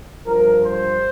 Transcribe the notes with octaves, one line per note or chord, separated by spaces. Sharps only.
G2 F3 A#4
C5